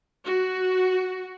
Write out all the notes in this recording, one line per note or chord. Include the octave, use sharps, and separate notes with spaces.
F#4